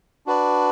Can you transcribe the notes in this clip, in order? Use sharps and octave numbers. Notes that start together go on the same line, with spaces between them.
D4 F#4 B4 D5